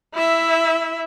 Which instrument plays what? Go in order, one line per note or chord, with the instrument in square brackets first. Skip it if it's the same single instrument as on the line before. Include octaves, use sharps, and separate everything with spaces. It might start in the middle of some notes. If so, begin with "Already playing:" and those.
[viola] E4 E5